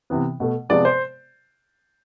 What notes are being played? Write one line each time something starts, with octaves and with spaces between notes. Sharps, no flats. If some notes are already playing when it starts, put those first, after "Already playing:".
C3 E3 B3
B2 A3
C3 F3 G#3 B3 D5
C5